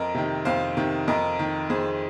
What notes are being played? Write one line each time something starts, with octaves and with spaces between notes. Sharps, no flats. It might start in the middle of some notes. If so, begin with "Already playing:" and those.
Already playing: F2 A#4 D#5
C3 D#3
F2 C5 F5
C3 D#3
F2 A#4 D#5
D#3
F2 G#4 C5